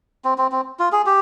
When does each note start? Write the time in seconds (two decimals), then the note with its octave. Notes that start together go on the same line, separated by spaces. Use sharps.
0.25 C4
0.38 C4
0.52 C4
0.79 F4
0.92 G#4
1.06 G4